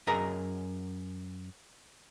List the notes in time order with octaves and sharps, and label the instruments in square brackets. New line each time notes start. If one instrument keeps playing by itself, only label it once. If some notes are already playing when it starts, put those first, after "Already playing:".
[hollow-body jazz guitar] F#2 G#4 A#4 D#5 A#5